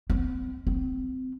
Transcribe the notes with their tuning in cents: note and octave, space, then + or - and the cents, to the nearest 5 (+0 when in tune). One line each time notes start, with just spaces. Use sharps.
C4 -45
C4 -25